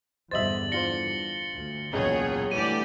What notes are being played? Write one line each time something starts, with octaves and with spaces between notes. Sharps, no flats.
E2 G2 D3 C5 D#5 E5 A6 F#7
D4 F4 C5 A#6 C#7 G7
D2
E1 C#2 A#2 F#3 G#4 C#5
D2 E3 G3 A3 G4 D5 D#7